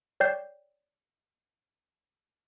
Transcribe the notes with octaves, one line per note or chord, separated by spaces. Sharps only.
C#5 D5 G5 G6 C7